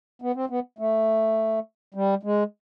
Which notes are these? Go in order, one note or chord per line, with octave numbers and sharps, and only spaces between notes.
B3
C4
B3
A3
G3
G#3